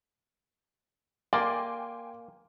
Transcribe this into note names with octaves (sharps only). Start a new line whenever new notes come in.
A#3 D5 G5 G#5 C6